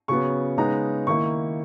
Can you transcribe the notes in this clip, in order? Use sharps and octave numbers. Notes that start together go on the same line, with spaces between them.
C#3 F#3 B3 C#6
C#3 G#3 B3 D#4 A#5
D#3 A#3 E4 C#6